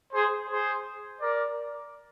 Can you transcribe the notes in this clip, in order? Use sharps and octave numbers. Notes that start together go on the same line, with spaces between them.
G#4 C5
G#4 C5
A#4 D5